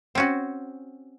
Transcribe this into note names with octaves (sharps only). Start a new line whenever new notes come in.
C4 C#4 F#4